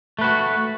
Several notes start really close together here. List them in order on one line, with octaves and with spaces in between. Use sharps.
A3 B4 F#4